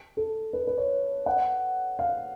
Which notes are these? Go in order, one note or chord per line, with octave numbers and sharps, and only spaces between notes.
A4
B4
B4
C#5
F#5
F5